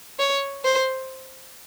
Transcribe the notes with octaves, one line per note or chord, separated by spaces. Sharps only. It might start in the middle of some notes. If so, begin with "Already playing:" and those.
C#5
C5